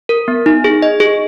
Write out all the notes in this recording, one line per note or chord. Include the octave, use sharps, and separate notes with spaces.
A#4
B3
D#4
G#4
D#5
G#4